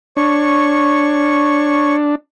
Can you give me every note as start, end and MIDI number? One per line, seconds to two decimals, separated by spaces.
0.17 2.15 62
0.17 1.96 73
0.17 1.96 85